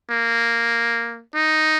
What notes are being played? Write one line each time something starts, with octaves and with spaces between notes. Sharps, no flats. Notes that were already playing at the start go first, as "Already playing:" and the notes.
A#3
D#4